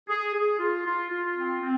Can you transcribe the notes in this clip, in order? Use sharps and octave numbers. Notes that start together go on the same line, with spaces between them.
G#4
G#4
F4
F4
F4
C4
C4